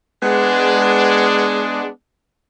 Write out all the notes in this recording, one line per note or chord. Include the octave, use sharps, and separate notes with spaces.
G#3 B3 D4